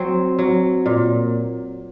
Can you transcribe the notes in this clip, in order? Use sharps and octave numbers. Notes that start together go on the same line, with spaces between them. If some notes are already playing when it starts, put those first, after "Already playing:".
Already playing: F#3 C4
F#3
A#2